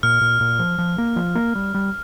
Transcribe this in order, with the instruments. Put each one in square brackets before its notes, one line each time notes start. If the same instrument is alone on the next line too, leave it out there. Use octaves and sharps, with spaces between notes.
[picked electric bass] A#2 [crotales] F6
[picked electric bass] A#2
A#2
F3
F3
A#3
F3
A#3
G3
G3